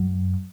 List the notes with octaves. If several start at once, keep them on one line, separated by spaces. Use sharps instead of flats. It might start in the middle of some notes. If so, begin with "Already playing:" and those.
Already playing: F#2